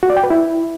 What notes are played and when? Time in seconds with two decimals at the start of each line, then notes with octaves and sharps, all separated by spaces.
0.03 F#4
0.10 D5
0.17 G5
0.23 B4
0.30 E4